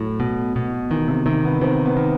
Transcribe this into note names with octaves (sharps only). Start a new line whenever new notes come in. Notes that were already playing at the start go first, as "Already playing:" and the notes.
Already playing: A2 F#3
B2
B2
D#3 E3
C3
C3 D#3
B3
D#3 C4
B3
D#3